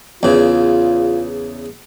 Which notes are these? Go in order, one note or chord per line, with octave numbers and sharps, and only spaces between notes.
E2 C#3 F4